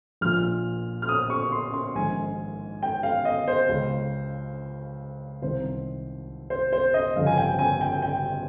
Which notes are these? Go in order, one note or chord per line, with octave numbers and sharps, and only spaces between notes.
A#1 A#2 F6
F6
D#6
C#6
C6
C6
A#1 G#2 D#3 G#5
G5
F5
D#5
C5
C#2 C#3
C2 C3 D#3 C5
C5
C5
D#5
G1 F2 C#3 F5
G#5
G5
G#5
G5
G5